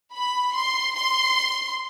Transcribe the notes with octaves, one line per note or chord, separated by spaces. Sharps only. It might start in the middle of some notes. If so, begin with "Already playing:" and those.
B5
C6
C6